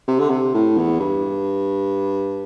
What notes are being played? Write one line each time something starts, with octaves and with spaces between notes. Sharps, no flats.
C3
D3
C3
A2
E2
G2